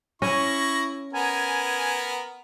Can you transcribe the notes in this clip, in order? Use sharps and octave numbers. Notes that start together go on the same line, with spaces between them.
C#4 E4 C#6 A#6
B3 A#4 G#5